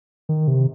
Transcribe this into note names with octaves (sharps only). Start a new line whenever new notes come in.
D#3
C3